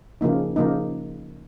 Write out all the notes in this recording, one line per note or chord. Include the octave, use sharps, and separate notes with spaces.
C#3 F3 A#3 D#4
C#3 F3 A#3 D#4